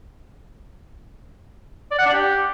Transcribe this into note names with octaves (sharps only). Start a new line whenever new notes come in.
D5
F#5
D4
G4